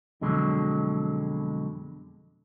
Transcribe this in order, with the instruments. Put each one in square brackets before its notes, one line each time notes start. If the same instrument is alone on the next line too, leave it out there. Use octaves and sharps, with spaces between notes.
[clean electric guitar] F2 B2 D3 F#3 G#3